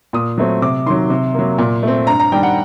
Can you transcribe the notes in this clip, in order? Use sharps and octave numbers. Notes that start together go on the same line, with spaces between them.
A#2 D#6
F#3 A3 C4
C3 D6
D#3 F#3 C6
C3
F#3 A#3
A#2
A3 C4
G2 A#5
A#5
D#3 G3 D4 G5
F#5